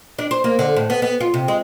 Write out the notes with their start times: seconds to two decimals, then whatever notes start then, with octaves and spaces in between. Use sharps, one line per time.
0.19 D4
0.31 C5
0.44 A#3
0.59 D3
0.76 A2
0.90 B3
1.02 B3
1.21 F4
1.34 C3
1.48 G#3